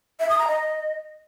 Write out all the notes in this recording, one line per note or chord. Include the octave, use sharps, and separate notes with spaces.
E5
D#6
A#5
D#5